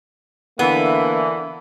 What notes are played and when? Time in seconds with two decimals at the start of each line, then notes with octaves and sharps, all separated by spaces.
0.59 D3 E3 A#3 B3